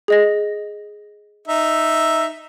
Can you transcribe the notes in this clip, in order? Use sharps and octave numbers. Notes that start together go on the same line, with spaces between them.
G#4 D#5 A#6
D#4 E5